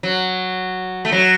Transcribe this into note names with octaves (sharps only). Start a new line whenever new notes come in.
F#3
A3
F#3